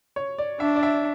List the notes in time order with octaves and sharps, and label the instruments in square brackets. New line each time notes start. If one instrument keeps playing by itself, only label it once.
[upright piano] C#5
D5
[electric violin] D4 [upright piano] E5
[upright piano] D5
E5